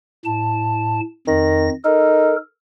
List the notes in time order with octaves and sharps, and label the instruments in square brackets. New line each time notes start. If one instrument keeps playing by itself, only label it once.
[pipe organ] A2 A5
[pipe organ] F2 A#6 [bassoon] D#3
[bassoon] D#4 [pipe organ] A4 A#4